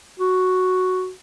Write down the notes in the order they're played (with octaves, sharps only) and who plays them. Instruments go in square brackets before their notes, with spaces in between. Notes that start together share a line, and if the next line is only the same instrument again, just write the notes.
[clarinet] F#4